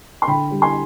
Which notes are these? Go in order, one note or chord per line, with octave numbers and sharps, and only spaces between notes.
C6
D3 G5 B5
G3
G#5 C6